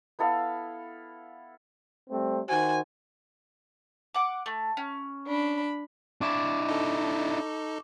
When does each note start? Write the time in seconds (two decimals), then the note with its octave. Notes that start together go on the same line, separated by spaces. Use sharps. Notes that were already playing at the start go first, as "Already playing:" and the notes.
0.19 B3 E4 A4 F5
2.10 G3 A3 C4
2.49 D#3 F#4 C5 G#5
4.14 F#5 D6
4.46 A3
4.77 C#4
5.27 D4 B5
6.21 D4 E4 C#6 D6 E7
6.68 D#4 A4